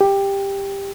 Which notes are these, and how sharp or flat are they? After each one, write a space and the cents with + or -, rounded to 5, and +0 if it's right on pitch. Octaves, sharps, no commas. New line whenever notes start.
G4 +10